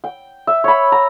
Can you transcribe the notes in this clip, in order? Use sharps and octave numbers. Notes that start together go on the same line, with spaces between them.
G5
E5
C#5 B5
A#5